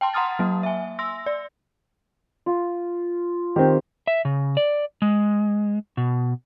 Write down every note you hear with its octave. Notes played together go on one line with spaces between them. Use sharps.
G5 A5 C6
F#5 A#5 C6 D#6 F6 A6
F#3 A#3
E5 G#5
C6 E6 A#6
D5
F4
D#3 C4 G4
E5
C#3
D5
G#3
B2